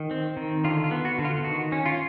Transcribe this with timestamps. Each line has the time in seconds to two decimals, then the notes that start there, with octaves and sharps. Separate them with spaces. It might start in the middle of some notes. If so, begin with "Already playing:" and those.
Already playing: D#3
0.11 C4
0.37 D#3
0.64 D3 F4
0.84 F4
0.91 B3
1.05 F#4
1.19 D3
1.25 F4
1.44 D#3 F#4
1.72 C#4
1.86 F4